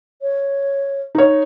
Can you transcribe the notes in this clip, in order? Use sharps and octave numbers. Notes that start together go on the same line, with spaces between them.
C#5
D#4 C#5